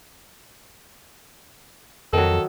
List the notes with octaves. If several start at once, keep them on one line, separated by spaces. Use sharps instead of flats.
F2 D#3 F#3 A4